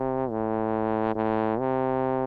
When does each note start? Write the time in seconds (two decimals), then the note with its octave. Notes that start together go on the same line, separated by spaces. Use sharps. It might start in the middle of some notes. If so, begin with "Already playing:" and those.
Already playing: C3
0.31 A2
1.15 A2
1.59 C3